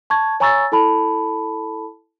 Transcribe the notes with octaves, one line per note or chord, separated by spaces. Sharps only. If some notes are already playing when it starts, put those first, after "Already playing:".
A5 C#6 G#6
C#5 G#5 A#5 C#6 E6 A6
E4 A4 A5 B5